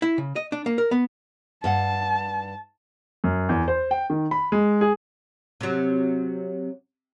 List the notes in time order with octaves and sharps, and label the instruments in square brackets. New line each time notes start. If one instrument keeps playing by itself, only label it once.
[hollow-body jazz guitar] E4
C#3
D#5
D4
A#3
A#4
B3
[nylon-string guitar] G2 F5 F#5 [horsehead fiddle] A5
[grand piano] F#2
E2
C5
G5
D#3
B5
G#3
G#4
[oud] C3 F#3